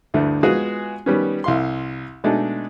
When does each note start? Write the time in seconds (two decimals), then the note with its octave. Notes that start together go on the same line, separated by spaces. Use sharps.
0.14 D2 G2 A3 E4
0.43 G#3 B3 F4 F#4 G#4
1.06 D#3 G3 B3 C#4
1.44 C2 F5 C6
2.24 B2 G#3 A3 D4 D#4